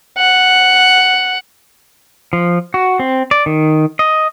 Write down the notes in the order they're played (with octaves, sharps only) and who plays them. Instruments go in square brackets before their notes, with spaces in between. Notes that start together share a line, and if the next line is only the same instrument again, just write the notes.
[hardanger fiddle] F#5
[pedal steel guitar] F3
F#4
C4
D5
D#3
D#5